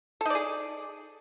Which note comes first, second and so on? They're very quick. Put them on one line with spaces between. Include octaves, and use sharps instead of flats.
A4 D#4 D5 G#4